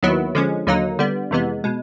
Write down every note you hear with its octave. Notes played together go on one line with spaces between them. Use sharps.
D#2 D#3 F#3 B3 E4
D3 F3 G#3 C#4
D#2 D3 F#3 A#3 D#4
D3 G3 B3
F2 C3 E3 G#3 B3
B2 G#3